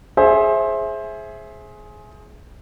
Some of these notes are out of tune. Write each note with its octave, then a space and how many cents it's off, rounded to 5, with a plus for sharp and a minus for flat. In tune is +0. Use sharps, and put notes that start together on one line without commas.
G#4 +15 C5 +20 E5 +0